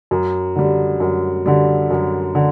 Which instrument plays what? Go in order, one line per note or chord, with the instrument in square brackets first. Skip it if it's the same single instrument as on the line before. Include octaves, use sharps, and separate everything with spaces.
[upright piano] F#2
D3 G3
F#2
D3 G3
F#2
D3